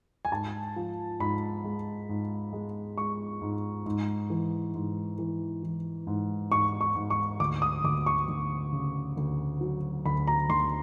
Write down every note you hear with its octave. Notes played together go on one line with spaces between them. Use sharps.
G#5
G#2 A5
F3
G#2 B5
G#3
G#2
G#3
G#3 C#6
G#2
G#2
E3
G#2
E3
E3
G#2
G#2 C#6
C#6
G#2
C#6
D2 D6
D#6
D2 D6
C#6
D2
C#3
D2
F#3
D2 B5
A#5
D2 C6